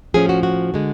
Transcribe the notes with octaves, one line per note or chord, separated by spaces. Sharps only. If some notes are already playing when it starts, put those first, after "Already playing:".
A2 F3 A3 C#4 G#4
F#4
F#4
D3 G#3